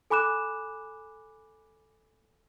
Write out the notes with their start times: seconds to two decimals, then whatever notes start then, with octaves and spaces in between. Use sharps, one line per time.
0.10 A4 G#5 B5 D6 F#6 E7